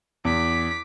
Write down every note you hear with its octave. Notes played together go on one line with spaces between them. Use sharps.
E2 D6 B6